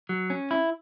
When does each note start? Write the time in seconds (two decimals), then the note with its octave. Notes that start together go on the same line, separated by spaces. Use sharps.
0.09 F#3
0.30 C#4
0.51 E4